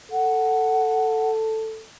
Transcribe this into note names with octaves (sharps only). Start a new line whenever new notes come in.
A4 F#5